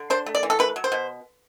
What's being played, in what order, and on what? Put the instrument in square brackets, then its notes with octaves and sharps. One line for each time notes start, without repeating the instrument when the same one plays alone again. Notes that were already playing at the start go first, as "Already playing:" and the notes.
Already playing: [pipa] D3
D4 C5
A3
D5
E3
A4
A3 B4
F#3
C5
B2